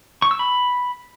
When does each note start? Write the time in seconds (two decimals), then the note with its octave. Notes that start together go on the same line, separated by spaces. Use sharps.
0.22 C#6
0.31 E6
0.39 B5